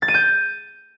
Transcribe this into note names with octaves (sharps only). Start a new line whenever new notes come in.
A6
D#7
G6